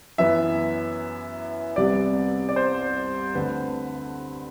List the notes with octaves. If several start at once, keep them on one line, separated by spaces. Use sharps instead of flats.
F#2 E3 B3 E5
C2 C3 G3 B3 D5
D5
C5
D2 D3 A3 C4 B4